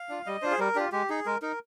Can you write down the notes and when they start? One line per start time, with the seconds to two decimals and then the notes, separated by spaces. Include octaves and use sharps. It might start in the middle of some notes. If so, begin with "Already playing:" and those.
Already playing: F5
0.09 D4 F4
0.26 G3 D#5
0.42 D4 F4 C5
0.51 G#4
0.59 G3 A#4
0.75 D4 F4 G4
0.92 G#3 G4
1.10 D#4 G#4
1.26 G#3 A#4
1.42 D#4 A#4